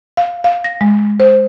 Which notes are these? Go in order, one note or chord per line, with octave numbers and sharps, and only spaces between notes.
F5
F5
A#6
G#3
C5